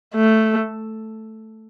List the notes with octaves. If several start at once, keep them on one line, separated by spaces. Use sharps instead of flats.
A3